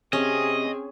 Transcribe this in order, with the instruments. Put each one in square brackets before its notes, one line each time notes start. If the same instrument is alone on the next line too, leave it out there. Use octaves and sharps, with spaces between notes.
[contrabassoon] C3 [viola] C4 G#4 [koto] C#4 [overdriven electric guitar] D#5